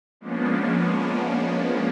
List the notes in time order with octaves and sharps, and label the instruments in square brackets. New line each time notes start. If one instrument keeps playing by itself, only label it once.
[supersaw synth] F3 G#3 A#3 B3 C#4 D4